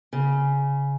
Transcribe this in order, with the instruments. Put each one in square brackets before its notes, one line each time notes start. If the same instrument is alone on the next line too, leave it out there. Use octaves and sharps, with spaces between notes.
[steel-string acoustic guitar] C#3